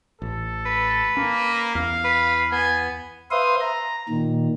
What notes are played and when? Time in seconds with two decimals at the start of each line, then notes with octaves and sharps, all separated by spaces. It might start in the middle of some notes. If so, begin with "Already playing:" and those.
0.22 A1 A4
0.66 B4
1.17 A#3 C#4
1.75 E2 F5
2.05 B4
2.52 B3 G#5
3.31 B4 C5 E5 F5 C6 D#6
3.61 A#5
4.09 A#2 D#3